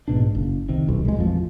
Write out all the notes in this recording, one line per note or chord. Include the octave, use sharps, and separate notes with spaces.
A#1 G#2 B2 D4
F#1
C2 C3 D#3
D#1 B1
C2 G#3
A1 F2 F3